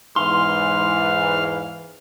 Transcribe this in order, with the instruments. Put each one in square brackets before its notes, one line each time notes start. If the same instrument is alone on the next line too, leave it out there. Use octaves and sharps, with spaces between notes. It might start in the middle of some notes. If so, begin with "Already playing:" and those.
[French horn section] E2 G#2 E3 [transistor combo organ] F5 [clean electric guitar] C6